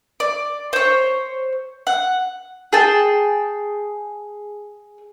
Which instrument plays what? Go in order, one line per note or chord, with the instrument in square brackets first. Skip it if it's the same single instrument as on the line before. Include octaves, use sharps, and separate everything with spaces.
[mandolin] D5
C5 C#5
F#5
G#4 G5 A5